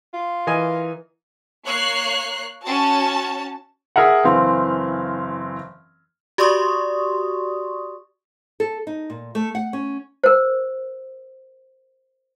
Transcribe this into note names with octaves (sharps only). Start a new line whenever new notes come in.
F4
E3 A#4 D#5 G#5
A#3 C#5 F#6 C7
C#4 F#4 A5
G#4 A#4 E5 F#5
F#1 E3 C4 F5
F#4 G4 D5 C6 C#6 D#6
A4
D#4
A#2
A3
F#5
C#4
A#4 C5